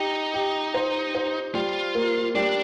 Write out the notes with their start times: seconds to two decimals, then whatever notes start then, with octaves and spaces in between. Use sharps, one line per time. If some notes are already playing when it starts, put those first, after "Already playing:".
Already playing: D#4 G4
0.34 G4
0.74 C5
1.15 C5
1.54 G3 F4
1.95 A#3
2.35 G3 D4